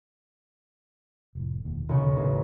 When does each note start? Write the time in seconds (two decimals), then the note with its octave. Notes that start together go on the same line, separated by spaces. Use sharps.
1.35 F1 A2
1.65 E1 D#2
1.89 B1 C#3 C#6
2.16 A1